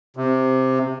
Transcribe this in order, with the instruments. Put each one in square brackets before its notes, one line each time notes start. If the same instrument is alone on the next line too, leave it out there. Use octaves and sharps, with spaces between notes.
[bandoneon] C3